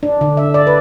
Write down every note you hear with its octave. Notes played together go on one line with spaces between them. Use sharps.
D4
D3
E5
D5
B4